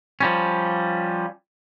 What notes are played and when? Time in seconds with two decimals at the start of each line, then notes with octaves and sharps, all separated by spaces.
0.21 F3 G3 C#4